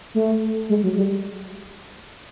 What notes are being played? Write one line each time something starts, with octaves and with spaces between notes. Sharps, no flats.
A3
G#3
F#3
G3